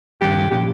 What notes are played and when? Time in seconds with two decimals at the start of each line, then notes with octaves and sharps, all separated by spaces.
0.21 G2 D#3 G3 C#4 G4
0.51 A#2 F3 A#3 C#4 G4